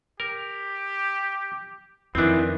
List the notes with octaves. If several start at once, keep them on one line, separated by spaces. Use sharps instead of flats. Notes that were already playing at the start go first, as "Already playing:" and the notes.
G4 A#4
F2 D#3 E3 B3 C4 D4